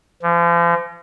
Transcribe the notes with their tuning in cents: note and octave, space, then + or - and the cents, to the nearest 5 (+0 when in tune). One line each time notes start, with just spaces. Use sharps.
F3 -40